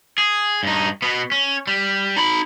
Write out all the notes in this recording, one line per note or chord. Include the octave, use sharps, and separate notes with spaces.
G#4
G2 D#4
B2 B3
C#4
G3
D#4 B5